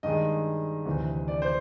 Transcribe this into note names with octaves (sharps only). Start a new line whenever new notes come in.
G2 D#3 G#3 D#5
D2 C3 E3
D5
C5